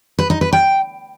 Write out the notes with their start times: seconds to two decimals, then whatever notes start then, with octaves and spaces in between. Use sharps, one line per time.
0.19 B4
0.30 D#4
0.41 B4
0.53 G5